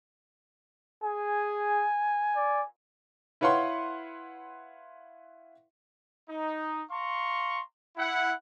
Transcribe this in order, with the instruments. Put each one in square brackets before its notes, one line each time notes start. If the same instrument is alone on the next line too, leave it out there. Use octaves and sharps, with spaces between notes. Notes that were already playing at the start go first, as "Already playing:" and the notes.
[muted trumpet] G#4 [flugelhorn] G#5
[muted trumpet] D5
[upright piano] E4 B4 C#5 F5 F#5 C6
[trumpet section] D#4
F5 A#5 C6 C#6
E4 F#5